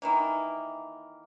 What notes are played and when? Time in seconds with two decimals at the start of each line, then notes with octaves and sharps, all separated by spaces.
0.02 D#3 E3 A#3